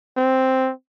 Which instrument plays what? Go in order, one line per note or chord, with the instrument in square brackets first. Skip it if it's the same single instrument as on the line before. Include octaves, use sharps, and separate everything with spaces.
[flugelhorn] C4